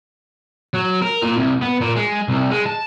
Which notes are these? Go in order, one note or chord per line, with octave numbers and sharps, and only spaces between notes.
F#3
A#4
A#2
C2
B3
A#2
G#3
C2
G#3
A5